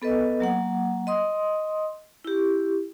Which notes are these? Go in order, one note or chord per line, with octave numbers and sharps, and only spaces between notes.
B3 A4 B4 D#5
F#3 A#3 F#5
D#5 C6 D#6
E4 G4